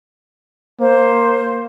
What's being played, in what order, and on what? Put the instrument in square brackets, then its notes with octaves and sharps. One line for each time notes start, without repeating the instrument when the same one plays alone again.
[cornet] A#3 [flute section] C5